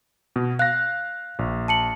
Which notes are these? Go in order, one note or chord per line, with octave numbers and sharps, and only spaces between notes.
B2
F5 F#6 A#6
A#1
A5 C#7 F#7